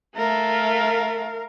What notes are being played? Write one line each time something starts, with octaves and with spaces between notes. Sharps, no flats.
A3 A#4 F5